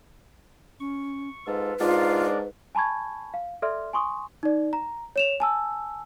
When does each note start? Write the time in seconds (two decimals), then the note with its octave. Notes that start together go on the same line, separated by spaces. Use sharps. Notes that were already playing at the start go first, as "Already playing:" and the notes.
0.80 C#4 C#6
1.47 G#2 F4 A4 B4
1.80 G#2 D4 F4 A#4 D5
2.75 G#5 A5 B5 C#6 G#6
3.34 F5
3.62 A4 D5 E5 C6 F6
3.93 G#5 C6 C#6 D#6
4.43 D#4 D5
4.73 A#5
5.16 C#5 E7 F7
5.40 G#5 A5 E6